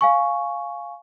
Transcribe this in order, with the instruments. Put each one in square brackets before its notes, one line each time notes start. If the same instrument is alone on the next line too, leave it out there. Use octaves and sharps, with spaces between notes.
[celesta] F5 G#5 C#6